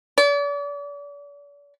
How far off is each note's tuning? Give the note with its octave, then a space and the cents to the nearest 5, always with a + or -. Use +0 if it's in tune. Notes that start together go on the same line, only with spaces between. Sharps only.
D5 -40